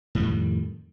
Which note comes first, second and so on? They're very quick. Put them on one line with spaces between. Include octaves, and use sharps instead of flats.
A2 G3 F2 D#3